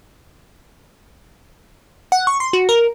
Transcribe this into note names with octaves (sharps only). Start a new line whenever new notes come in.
F#5
C#6
C6
F#4
A#4